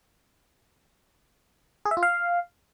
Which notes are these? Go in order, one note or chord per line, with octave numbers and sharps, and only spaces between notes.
G#4
E5
F4
F5